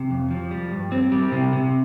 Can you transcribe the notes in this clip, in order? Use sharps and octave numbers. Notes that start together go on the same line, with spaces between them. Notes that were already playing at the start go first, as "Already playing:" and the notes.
Already playing: C3
F2
F3
G3
G2
C4
G3
C3
C3